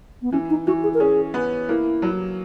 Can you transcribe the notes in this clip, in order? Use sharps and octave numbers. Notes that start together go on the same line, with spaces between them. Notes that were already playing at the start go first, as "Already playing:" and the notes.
B3
E3 C#4
D#4
E3 F#4
G#4
A#4
C#4 G#4
B3
A#3 E4
F#3